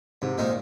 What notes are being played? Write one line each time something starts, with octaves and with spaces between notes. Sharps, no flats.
G#2 C3
A#2 D#3 G#3 C4 D#4